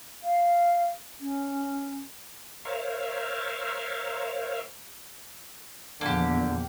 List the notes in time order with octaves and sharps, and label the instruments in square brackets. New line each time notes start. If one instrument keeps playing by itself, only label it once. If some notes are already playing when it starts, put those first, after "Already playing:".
[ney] F5
C#4
[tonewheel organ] A#4 C5 C#5 E5 F5
[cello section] E2 A#2 F3 [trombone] D3 [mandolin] A#3 G4